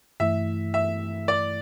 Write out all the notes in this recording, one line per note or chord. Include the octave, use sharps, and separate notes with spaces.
G2 E3 A3 E4 E5
E5
D5